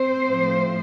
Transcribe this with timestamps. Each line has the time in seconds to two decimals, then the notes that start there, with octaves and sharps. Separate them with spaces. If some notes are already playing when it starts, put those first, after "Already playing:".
Already playing: C4 C5
0.28 A2 F3 A3